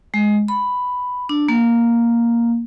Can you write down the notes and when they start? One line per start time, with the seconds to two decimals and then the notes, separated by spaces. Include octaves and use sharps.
0.14 G#3
0.48 B5
1.29 D4
1.49 A#3